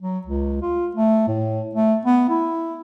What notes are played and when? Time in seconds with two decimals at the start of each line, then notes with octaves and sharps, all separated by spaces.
0.02 F#3
0.26 C#2
0.62 F4
0.95 A3
1.28 A2
1.75 A3
2.05 B3
2.30 E4